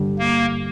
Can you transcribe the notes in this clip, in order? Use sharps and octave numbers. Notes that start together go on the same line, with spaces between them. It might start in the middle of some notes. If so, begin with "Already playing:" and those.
Already playing: G2 D3 G3
A#3